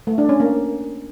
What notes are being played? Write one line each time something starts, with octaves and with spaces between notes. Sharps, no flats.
A3
D4
C#4
A#3